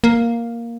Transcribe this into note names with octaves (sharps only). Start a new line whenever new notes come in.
A#3